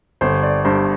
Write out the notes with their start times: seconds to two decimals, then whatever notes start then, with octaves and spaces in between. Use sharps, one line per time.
0.21 G1 C5
0.43 D5
0.65 G2 C5